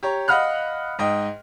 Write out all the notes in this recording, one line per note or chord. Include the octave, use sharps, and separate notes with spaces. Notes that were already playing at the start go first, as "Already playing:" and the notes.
G4 C#5 A#5
D#5 F5 F#5 B5 F6 F#6
G#2 D#5 G5